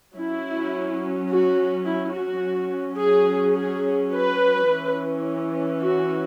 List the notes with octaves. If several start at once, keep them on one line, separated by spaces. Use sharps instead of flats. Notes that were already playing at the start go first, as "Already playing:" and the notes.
F#3 C#4 E4
F#4
E4
F#4
F#3 C#4
G#4
G#4
B4
E3 C#4
F#4